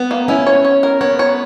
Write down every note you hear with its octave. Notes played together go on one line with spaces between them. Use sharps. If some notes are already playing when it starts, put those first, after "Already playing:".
Already playing: B3
A#3
C#4 E4
C#5
C#5
A#4
B3 C#5
C#5